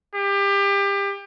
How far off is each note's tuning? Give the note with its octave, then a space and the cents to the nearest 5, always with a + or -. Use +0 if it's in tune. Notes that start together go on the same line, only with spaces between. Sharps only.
G4 +25